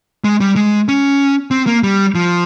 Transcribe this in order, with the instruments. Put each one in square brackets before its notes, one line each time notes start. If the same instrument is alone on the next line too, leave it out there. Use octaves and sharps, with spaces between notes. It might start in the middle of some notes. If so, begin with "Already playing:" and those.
[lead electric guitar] G#3
G3
G#3
C#4
C4
A#3
G3
F3